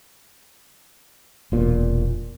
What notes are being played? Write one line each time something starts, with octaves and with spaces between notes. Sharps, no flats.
E1 A#2